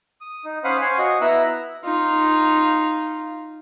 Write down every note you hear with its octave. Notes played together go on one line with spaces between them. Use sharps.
D#6
D#4
C#4 C5 F5 F#5 B5 D#6
C5 C#5 F5 F#5 G#5 C6
F#4 D#5 C#6
B3 E4 E5 A#5 E6 F#6
D#4 F4